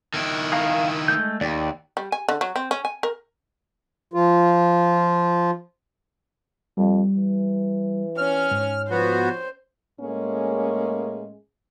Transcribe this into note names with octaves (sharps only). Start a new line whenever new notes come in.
D#3 E4
G#4 F5 A#5
G#3 A3 G6
D#2 D5 G5
G3
G#5
D3
F#3
C4
C#4
G#5
A#4
F3 F4
F2 G3
E3
C#4 F6
G#2
F3 B3 F#4 C5
A2 G#3 A#3 C#4 G#4